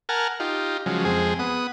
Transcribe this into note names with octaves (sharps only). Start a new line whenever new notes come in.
A#4 F#5 G#5 A5 F6
D#4 F4 G4
C#3 F3 F#3 G#3
F2 G#3 C4 G#4
B3 F#5 D#6